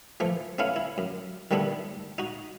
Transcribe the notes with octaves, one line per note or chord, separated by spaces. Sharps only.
E3 F3 A3
A3 B3 C#4 E4 F5
E4
F#2
D#3 G3 A3 B3 D4 E4
D#4 F#4